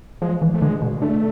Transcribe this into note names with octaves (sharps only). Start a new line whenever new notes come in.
F3 G#3
E3
A3
D3 G#3
B2
D3 A3